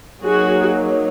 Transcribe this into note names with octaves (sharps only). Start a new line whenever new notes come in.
F#3 A#3 D#4 F#4 G#4